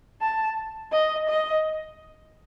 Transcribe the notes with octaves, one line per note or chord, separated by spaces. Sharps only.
A5
D#5
D#5